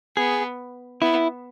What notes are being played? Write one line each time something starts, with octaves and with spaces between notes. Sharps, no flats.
B3 G#4
B3 E4